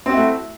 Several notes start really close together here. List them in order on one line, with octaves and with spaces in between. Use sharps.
C4 F#4 E4 A3